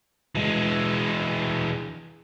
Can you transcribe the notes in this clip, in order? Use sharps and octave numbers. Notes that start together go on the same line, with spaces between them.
E3 G#3